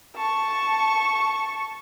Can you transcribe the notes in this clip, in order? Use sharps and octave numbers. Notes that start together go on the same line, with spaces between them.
A5 C#6